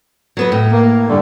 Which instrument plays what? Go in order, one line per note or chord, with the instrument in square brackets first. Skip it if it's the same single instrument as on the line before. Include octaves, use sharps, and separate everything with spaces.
[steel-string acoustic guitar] F#3 B3 B4
A2
[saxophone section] A#3
G2 D3 A3